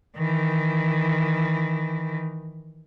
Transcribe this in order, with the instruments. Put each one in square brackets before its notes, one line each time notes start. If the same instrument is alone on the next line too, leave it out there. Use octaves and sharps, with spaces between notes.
[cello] D#3 E3